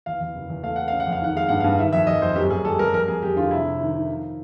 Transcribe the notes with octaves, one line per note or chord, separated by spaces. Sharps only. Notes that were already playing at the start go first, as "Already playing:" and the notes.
E2 F5
E2
F#1
E2
A3 F5
A3 F#5
C#3 F5
F#5
F2
F5
D#3 F#5
G#3 F5
G2 F#5
F5
G2
D#3 E5
F2 E5
F2 D#5
F2 C5
F#2 G4
F#2 G#4
G3 A4
G3 A#4
F2 A#4
F2 G#4
F2 G4
D3 F4
C3 E4
C3
D#3
D#3
F3